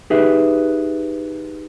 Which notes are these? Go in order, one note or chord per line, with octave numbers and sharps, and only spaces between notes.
D#4 G4 G#4 B4 E5